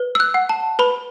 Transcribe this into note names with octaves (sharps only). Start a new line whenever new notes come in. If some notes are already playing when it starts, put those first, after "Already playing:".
Already playing: B4
E6
F#6
F#5
A5
B4 B5